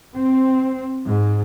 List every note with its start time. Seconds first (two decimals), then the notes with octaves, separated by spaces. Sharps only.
0.13 C4
1.05 G#2